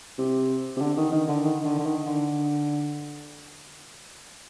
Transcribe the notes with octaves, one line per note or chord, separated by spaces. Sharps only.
C3
C3
D3
D#3
D#3
D3
D#3
D3
D3
D#3
D3